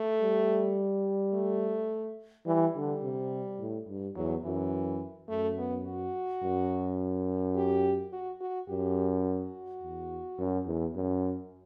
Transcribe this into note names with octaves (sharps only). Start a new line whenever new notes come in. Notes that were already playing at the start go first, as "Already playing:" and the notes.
Already playing: A3
G3
A3
E3 G3
D3 G3
C3
A2
G2
E2 F#3
F#2 E3
F#2 A3
B3
F#4
F#2
G4
F#4
F#4
F#2 G4
F#4
E2
F#2
E2
F#2